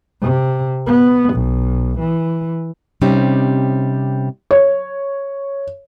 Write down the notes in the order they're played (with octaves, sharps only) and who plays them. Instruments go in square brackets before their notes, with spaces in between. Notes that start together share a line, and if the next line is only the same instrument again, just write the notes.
[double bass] C3
B3
B1
E3
[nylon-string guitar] C3 G3 C4 C#4 D#4
[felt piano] C#5